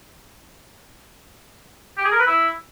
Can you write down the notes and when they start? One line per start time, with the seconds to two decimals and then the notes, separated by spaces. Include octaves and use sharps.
1.98 G4
2.05 G#4
2.12 A#4
2.20 B4
2.27 E4